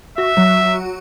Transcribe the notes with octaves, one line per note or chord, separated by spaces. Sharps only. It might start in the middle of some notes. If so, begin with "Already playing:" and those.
F#4 E5
F#3